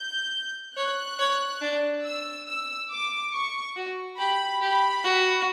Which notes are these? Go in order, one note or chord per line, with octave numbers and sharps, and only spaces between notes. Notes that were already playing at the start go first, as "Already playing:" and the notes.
Already playing: G6
C#5 F#6
C#5
D4
E6
E6
D6
C#6
F#4
G4 B5
G4 B5
F#4